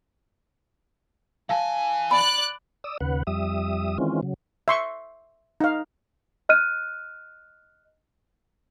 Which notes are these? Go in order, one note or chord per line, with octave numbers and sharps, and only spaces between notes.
E3 F5 G#5 A5
D5 B5 F#6
D5 D#6 E6
D#2 C#3 B4 F#5
F2 G3 E5 D#6
D#3 E3 G#3 C4 C#4 F4
C#3 F#3
E5 C6 C#6
D#4 F5
D#5 F6 F#6 D#7